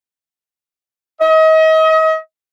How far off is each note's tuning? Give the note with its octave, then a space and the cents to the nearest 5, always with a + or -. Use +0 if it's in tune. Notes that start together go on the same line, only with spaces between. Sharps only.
D#5 +35